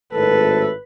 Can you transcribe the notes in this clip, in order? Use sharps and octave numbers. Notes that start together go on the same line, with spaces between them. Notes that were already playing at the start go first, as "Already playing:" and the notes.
G#1 A2 A4 B4